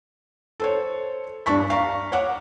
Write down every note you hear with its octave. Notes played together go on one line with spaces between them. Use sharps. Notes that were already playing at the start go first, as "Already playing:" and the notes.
A4 C5 C#5
G2 D4 D5 A5 C#6 B6
F5 A#5 C#6
C#5 F#5 D6